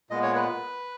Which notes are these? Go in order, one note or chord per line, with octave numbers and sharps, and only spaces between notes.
A#2 G#3 B3 D#5
C#5
B4